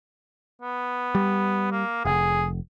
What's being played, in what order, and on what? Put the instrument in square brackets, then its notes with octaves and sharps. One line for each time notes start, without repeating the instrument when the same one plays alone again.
[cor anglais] B3
[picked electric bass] G3
[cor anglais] A#3
[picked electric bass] F1 [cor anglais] G#4